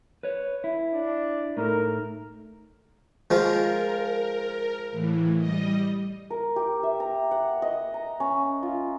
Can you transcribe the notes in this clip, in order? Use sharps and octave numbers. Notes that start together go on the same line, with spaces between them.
B4 C#5
E4
D4
A2 D#4 A4 A#4
F3 G#3 F4 A#4
A2 E3
G3 D#5
A#4
G4
E5
A#5
F#5
D#5
A#5
C#4
F4